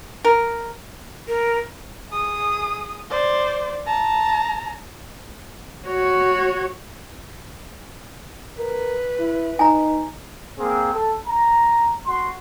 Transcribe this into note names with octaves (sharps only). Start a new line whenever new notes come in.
A#4
A#4
G#4 D#6
C5 D5
A5 A#5
F#4 C#5
A#4 B4
E4
D#4 G#5 A#5
A#3 C4 G#4
A4
A#5
F#4 C6